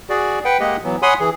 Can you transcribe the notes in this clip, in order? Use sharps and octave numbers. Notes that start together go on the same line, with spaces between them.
F#4 G#4 D5
B4 F#5 G5
G#3 A#3 G4 D#5 F#5
E3 F#3 B3
C#5 F#5 G#5 B5 C6 D#6
E3 G#4